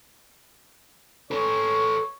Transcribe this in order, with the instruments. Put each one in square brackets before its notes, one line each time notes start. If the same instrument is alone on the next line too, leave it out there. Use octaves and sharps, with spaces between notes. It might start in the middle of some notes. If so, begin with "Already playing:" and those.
[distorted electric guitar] A4 B4 [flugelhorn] C#5